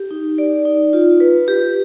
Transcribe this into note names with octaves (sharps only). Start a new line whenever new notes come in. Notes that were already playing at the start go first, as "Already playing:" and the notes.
Already playing: G4
D#4
D5
D#4
F4
B4
G4